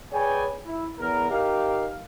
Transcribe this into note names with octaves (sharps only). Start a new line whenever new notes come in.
G#4 B4 C#5 D5 G5 G#5
E4
E2 A#4
D#4 G4 A#4 F5